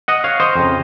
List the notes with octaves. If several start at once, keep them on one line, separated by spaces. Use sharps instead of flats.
D#5 F#5
C#5 F5
C5 D#5
F2 C#3